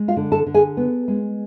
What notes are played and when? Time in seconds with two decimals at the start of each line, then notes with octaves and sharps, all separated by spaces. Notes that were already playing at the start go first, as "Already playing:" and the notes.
Already playing: G#3
0.08 F4 F5
0.17 D3
0.32 A4 A5
0.46 D3
0.54 G#4 G#5
0.77 B3
1.08 G#3